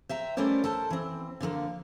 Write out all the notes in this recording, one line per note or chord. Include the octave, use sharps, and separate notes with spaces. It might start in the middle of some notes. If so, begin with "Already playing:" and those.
C5 E5 G5 A#5
G3 A3 C#4 A#4 C5 D5
A4 A#4 C5 A5
E3 C4
D3 F3 A3 A#3